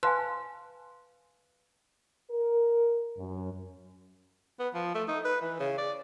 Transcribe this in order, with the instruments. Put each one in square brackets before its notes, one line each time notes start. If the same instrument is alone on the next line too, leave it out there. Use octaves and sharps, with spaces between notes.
[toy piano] B4 F5 G#5 [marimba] A5 C6 F#6
[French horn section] A#4
F#2
[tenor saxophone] B3
F3
A3
D#4
B4
E3
C#3
D5